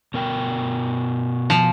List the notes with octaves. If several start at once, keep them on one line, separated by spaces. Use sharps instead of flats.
B2 A#4 G5
F3